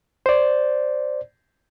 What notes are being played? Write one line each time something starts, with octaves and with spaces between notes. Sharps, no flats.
C5 D5